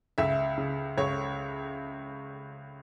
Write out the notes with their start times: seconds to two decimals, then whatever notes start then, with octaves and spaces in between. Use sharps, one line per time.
0.18 C#2 E5
0.58 C#3
0.98 C#2 C#5